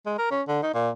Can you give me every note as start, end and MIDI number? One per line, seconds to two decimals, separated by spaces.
0.06 0.17 56
0.18 0.27 70
0.31 0.42 61
0.48 0.62 50
0.63 0.74 63
0.74 0.90 46